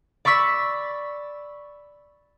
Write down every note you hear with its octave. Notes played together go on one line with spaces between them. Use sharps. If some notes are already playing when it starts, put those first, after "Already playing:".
D5 B5 C#6 E6 B6